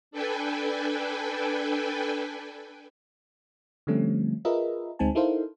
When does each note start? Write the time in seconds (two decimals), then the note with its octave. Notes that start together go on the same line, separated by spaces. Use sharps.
0.11 D4 A4 B4 G5 G#5
3.87 D3 F3 G3 A3 C4 C#4
4.45 F4 G#4 A#4 B4 D#5 E5
4.99 D2 G#3 C4 D#4 G#5 A5
5.15 D#4 E4 A4 A#4 C5 F5